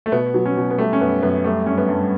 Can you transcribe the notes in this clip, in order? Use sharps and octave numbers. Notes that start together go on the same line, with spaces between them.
A3
B2 B3
F#3
C#4
B2
B3
G3 A3
C#4
F#2 B3
F#2 B3
G3 A3
G2 C#4
B3
G2